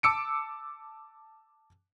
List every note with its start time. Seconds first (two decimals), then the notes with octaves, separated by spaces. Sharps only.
0.03 A5 D6 E6 C#7 D7